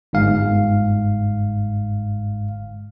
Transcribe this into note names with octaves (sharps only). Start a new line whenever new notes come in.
G1 G#2 F5